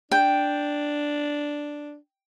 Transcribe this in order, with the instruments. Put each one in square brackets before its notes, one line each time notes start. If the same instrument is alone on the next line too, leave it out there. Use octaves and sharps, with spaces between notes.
[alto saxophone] D4 [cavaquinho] G5